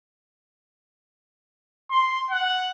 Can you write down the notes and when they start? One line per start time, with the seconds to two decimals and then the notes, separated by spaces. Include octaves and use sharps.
1.91 C6
2.31 F#5